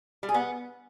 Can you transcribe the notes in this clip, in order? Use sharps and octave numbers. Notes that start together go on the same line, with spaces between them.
G3
G#4
B3